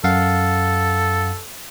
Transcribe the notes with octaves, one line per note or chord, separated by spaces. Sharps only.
F#2 A4 F5 F#5